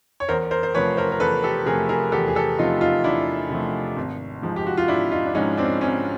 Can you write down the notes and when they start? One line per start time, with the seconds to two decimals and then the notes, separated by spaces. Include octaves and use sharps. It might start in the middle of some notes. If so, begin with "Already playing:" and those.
0.20 C#5
0.29 E2 A#4 C5
0.51 A#4 C5
0.63 C5
0.74 C3 F3 A3 B4 C#5
0.97 A#4 C5
1.12 A#4
1.20 E2 A4 B4
1.43 G4 A4
1.66 C3 F3 A3 G#4 A#4
1.89 G#4 A#4
2.12 E2 G4 A4
2.28 G#4
2.35 G4 A4
2.59 C3 F3 A3 D#4 F4
2.81 D#4 F4
3.04 E2 D4 E4
3.50 C3 F3 A3
3.96 G#1
4.42 G#2 F3 G#3
4.56 G4
4.66 F#4
4.77 F4
4.88 G#1 D4 E4
5.12 D#4 F4
5.25 D4
5.35 G#2 F3 G#3 C#4 D#4
5.57 C4 D4
5.80 G#1 C#4